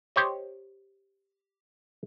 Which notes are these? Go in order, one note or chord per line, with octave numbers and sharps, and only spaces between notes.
G4 C5 C#5 D#5